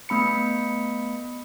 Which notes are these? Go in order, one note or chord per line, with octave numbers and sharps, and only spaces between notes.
A3 B3 B5 C#7